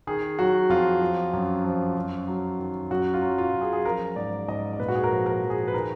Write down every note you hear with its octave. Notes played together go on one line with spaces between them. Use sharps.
D#3 G#4
F#3 F#4
F2 F4
F3
F#2
F3
F#2
F#3
D#3
F#2 F#4
F4
F#3
F4
F#2
G#4
G#4
F3 A#4
G#2 D5
G#2 D#5
D5
A#2 B4
F#4
G#4
A#4
F3
A#4
F3
G#4
B4
D#3 A#4